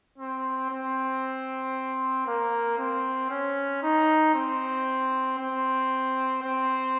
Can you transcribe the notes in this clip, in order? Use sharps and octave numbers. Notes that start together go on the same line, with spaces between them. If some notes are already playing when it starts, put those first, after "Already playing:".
C4
C4
A#3
C4
C#4
D#4
C4
C4
C4